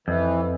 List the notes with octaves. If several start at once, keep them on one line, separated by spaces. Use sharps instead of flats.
F2 E3